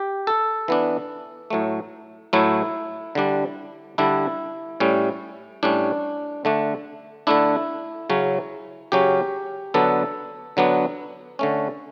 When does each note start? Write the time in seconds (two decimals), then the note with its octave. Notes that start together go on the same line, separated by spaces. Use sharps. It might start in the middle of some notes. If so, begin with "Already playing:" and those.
Already playing: G4
0.27 A4
0.68 E3 B3 D4
1.50 A2 F#3 A3
2.33 A2 F#3 A3 E4
3.15 D3 G3 D4
3.98 D3 G3 D4 E4
4.80 A2 G3 C#4
5.63 A2 G3 C#4 D4
6.45 D3 A3 D4
7.27 D3 A3 D4 E4
8.10 C#3 F#3 C#4
8.92 C#3 F#3 C#4 G4
9.74 D3 F#3 B3 D4 A4
10.57 D3 F#3 B3 D4
11.39 D3 A3 C#4